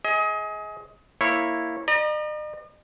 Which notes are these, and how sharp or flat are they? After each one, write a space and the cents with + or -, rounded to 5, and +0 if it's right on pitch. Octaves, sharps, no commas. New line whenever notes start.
G#4 +10 D#5 +30
A#3 +0 E4 +0 C#5 -15
D#5 -45 A#5 +35